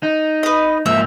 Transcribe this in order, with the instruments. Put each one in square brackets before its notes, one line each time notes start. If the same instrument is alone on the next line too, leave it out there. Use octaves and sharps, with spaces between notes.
[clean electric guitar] D#4
[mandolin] B4 D#5
[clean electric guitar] G#2 F3 A#3 [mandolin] E5